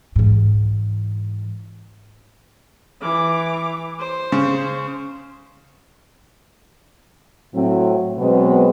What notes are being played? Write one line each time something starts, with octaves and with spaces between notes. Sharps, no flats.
G#2 E3
E3 D6
C5
C#3
A2 F#3 C4
B2 F#3 G#3 B3 C4